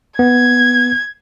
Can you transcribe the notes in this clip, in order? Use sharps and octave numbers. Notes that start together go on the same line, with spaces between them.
B3 G#6